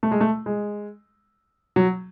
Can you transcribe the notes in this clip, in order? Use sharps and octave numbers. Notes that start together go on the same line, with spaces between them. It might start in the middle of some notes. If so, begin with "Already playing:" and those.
A3
G#3
A3
G#3
F#3